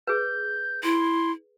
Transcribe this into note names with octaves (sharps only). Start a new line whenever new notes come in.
G#4 B4 G6
E4 C6